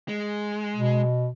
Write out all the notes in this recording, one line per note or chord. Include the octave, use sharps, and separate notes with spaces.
G#3
B2